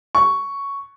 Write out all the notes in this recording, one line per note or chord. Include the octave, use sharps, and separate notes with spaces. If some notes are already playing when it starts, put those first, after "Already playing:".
C#6